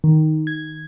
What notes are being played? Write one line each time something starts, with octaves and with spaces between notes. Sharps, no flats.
D#3
G#6